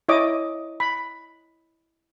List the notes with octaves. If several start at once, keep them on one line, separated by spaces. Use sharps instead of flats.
E4 C#5 D#5 D6
B5